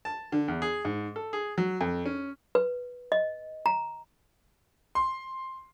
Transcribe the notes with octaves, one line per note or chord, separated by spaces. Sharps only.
A5
D3
E2
G#4
G#2
A4
G#4
F#3
F2
C#4
B4
D#5
A#5
C6